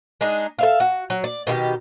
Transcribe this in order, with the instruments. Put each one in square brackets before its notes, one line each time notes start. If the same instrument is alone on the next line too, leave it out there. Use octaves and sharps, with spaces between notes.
[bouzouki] G#3 D4 D#4
A4 E5 F5
F#4
F#3
D5
B2 D#3 E4 G4